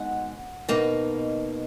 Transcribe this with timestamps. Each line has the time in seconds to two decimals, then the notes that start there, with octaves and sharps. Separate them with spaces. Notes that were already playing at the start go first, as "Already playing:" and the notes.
Already playing: B2 G#3 D#4 F#5
0.69 B2 A#3 D#4